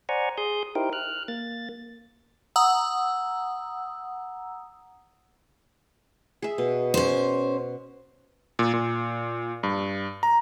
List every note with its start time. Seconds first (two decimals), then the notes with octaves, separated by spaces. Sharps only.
0.09 C5 D5 F#5 G#5 A#5 C#6
0.38 G#4 C6 D#6 G6
0.75 D#4 E4 G4 A#4 C5 G5
0.93 F6 F#6
1.28 A#3 A6
2.56 F#5 A#5 D#6 E6
6.42 G#4 E5
6.58 B2
6.94 C#4 C5
8.59 A#2
8.73 A#2
9.63 G2
10.23 A#5